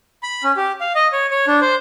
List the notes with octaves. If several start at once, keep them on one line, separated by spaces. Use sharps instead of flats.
B5
C#4
G4
F5
D#5
C#5
C#5
D4
C5